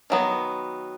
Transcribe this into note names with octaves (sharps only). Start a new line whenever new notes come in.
D#3 F#3 B3